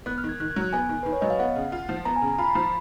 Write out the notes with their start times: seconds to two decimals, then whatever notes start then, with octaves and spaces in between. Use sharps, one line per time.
0.06 B3 F#6
0.18 F6
0.24 D#3
0.29 G#6
0.40 D#3 F#6
0.51 G#6
0.56 F#3
0.61 F#6
0.73 B3 G#5
0.89 D#3
1.03 D#3 B4
1.13 C#5
1.21 F#3 D#5
1.30 F5
1.39 B3 F#5
1.56 C#3
1.72 F4
1.89 F3
2.05 B3 A#5
2.16 G#5
2.22 C#3
2.28 A#5
2.38 F4 B5
2.55 F3